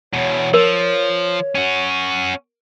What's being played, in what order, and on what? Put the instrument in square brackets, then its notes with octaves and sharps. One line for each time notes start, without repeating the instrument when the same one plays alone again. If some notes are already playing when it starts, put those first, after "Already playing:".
[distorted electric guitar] E2 B2 [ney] C#5
[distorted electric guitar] F3 [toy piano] A#4
[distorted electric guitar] C#4 F#4